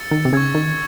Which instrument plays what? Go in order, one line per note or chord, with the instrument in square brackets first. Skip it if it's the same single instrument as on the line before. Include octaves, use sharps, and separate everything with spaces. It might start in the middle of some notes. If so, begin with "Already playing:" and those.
Already playing: [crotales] E6 A6 C#7
[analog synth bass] D#3
C3
[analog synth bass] C#3 [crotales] C#6 E6 G#6
[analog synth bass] D#3